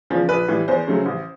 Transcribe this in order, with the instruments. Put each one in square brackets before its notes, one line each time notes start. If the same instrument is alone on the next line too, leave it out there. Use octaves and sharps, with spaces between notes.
[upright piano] E2 C#3 F3
A#1 B4
A2 E3 G3
E2 C5
C#3 F#3 A3 C#4
A1